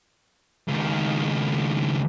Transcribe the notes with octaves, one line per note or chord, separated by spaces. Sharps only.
C#2 D#3